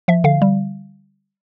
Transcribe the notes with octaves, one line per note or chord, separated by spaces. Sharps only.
F3 E5
D3 F5
G3